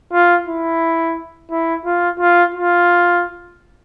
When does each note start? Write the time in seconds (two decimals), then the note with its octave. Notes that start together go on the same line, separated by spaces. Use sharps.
0.13 F4
0.48 E4
1.51 E4
1.86 F4
2.20 F4
2.54 F4